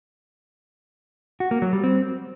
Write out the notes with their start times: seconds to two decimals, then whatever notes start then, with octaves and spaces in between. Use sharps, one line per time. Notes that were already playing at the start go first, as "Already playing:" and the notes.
1.40 F#4
1.51 A#3
1.62 F#3
1.73 G3
1.84 C4